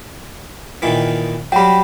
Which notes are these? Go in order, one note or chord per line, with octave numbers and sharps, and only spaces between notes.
A#2 D#3 E3
F#3 G3 G5 B5